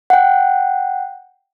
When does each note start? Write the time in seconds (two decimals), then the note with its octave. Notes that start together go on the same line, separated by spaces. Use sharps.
0.10 F#5 G5